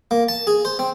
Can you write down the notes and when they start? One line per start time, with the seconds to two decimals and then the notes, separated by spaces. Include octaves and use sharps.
0.11 A#3
0.29 A5
0.47 G#4
0.65 C5
0.79 C4